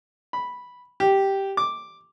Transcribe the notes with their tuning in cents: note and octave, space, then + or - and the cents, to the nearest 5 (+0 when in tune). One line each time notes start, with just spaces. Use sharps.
B5 -5
G4 -5
D6 +0